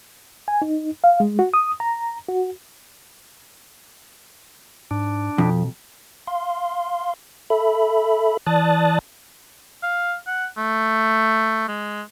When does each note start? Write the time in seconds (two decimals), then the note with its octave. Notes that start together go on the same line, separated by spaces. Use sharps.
0.48 G#5
0.62 D#4
1.04 F5
1.20 G#3
1.39 F#4
1.54 D#6
1.80 A#5
2.29 F#4
4.91 G#2 D4
5.38 F2 B2
6.27 F5 C6
7.50 A4 E5 B5
8.47 E3 D5 A5 D#6 F#6 A6
9.83 F5
10.27 F#5
10.58 A3
11.68 G#3